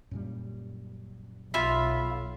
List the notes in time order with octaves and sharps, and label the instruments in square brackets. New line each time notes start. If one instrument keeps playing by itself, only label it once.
[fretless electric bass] F#2 A#2 G3
[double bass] B1 [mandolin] F4 E5 B5